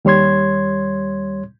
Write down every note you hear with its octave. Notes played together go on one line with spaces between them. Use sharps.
D#2 G3 C#5 C6 G#6